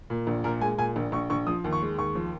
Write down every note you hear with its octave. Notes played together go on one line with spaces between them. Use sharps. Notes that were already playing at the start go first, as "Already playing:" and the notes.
A#2
A#1
A#2 A#4
G#3 G#5
A#2 G#5
A#1
A#1 C#6
A#1 C#6
F3 D#6
D#2
C#6
G#3
D#2 C#6
F3